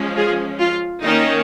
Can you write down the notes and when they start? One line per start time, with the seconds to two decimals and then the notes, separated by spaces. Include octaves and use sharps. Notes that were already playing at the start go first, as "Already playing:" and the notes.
Already playing: F3 G#3 C#4
0.15 F4 G#4
0.59 F4
1.03 D#3 A#3 C#4 D#4